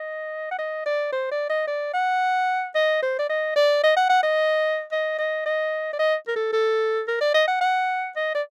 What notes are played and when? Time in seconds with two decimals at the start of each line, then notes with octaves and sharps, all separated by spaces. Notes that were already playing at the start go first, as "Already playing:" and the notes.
Already playing: D#5
0.51 F#5
0.59 D#5
0.86 D5
1.12 C5
1.31 D5
1.49 D#5
1.67 D5
1.94 F#5
2.75 D#5
3.02 C5
3.19 D5
3.29 D#5
3.56 D5
3.83 D#5
3.96 F#5
4.09 F#5
4.23 D#5
4.92 D#5
5.18 D#5
5.46 D#5
5.93 D5
5.99 D#5
6.28 A#4
6.36 A4
6.53 A4
7.08 A#4
7.21 D5
7.34 D#5
7.48 F#5
7.61 F#5
8.16 D#5
8.35 D5